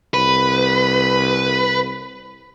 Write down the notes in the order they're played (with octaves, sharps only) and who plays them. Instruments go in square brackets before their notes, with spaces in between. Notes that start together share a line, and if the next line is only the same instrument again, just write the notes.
[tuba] C2 [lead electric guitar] B4